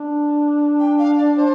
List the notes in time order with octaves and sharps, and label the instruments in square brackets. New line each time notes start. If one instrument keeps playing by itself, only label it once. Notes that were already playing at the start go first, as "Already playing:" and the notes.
Already playing: [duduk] D4
[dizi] G5
F5
D5
C5